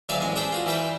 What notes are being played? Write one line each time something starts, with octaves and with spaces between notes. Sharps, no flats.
D2 F#3 D5 E5 F5 G#5
A1 G#3 G#5
D4 G#4 C5 G5 B5
F4 F#4 G#4
E3 G3 B4 C5 G5